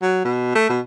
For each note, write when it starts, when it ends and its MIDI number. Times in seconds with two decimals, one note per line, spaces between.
0.02 0.22 54
0.25 0.52 47
0.55 0.68 57
0.69 0.80 47